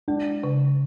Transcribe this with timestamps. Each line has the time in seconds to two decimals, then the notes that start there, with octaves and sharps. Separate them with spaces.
0.08 G#3 D4
0.44 C#3